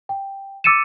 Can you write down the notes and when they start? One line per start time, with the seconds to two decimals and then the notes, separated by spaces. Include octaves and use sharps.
0.09 G5
0.64 D6 E6 A6 C#7 D#7 E7